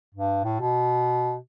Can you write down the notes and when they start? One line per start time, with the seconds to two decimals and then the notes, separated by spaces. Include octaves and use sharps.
0.15 G2
0.44 A2
0.60 B2